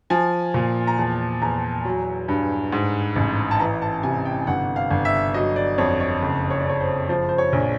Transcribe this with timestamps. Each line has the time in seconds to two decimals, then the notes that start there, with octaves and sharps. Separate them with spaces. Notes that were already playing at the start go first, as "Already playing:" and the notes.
0.10 F3 G#5
0.54 A#2
0.87 A#5
0.98 E2 A5
1.42 E2 A#5
1.85 F#3
2.28 G2
2.72 G#2
3.16 A1
3.51 A5
3.60 E3 A#5
3.82 A5
4.03 C3 G#5
4.25 G5
4.47 G1 F#5
4.76 F5
4.91 G1
5.05 E5
5.34 F#3 D#5
5.56 D5
5.78 F2 C#5
6.00 C#5
6.22 F#1
6.50 C#5
6.60 D5
6.66 F#1 C#5
6.80 C5
7.09 F3 C5
7.29 C5
7.38 C#5
7.53 A#1